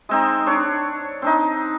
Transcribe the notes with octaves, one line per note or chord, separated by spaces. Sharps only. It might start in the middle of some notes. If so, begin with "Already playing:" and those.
G#3 C4 D#4
D4 C#5
C4 D4 D#4